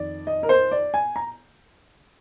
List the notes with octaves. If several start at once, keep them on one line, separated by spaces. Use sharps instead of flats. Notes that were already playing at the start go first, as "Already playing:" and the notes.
Already playing: F2 D#3 D5
D#5
A#4
C5
D5
G#5
A#5